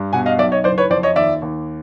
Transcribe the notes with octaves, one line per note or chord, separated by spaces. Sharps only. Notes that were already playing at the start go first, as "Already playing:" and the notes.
Already playing: G2
B2 F#5 G#5
D#5 F5
B1 D5 E5
C#5 D#5
F#1 C5 D5
B4 C#5
F2 C5 D5
C#5 D#5
D#2 D5 E5
D#2